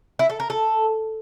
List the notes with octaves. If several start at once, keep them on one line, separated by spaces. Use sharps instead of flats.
E4
A4
A#4
A4